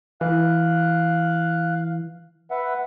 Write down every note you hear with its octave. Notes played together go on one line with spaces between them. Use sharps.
E3 F5 F#6
B4 E5 F#5